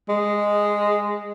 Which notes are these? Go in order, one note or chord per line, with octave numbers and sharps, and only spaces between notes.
G#3